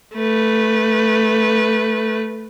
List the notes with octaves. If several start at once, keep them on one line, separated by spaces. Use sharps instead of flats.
A3 B4